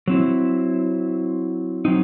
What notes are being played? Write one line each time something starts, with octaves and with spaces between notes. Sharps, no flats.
F#3 C4 E4
F#3 C4 D#4